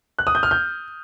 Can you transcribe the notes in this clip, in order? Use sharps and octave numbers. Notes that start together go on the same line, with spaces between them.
F#6
D#6
G6
F6
G6